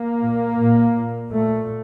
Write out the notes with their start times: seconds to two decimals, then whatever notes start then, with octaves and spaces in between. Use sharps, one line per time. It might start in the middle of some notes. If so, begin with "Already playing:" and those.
Already playing: A#3
0.20 A#2
0.58 A#2
0.95 A#2
1.32 A#2 A3